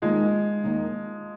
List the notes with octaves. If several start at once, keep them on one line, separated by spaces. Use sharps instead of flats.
D#2 D#3 F3 G#3 A#3 D#4
D#2 D#3 A#3 D#4